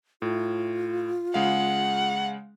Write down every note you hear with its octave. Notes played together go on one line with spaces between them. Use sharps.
A2 F4
C#3 G#3 F5 F#5